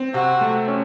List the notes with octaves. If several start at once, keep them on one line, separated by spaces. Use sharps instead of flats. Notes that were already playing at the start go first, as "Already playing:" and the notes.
Already playing: C4
C3 F#4
A3
C#4